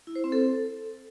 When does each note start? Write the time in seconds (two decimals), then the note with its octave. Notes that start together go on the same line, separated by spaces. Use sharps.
0.07 E4
0.16 C5
0.24 C4
0.32 A4